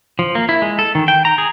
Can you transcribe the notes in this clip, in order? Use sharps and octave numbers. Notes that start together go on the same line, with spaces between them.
F3
A#3
E4
G#3
A4
D#3
G5
A#5
G#4